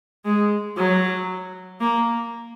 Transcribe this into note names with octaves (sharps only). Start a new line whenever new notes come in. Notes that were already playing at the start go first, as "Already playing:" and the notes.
G#3
F#3
A#3